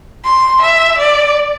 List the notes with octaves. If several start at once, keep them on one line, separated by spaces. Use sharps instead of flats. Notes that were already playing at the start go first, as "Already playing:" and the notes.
C6
E5
D5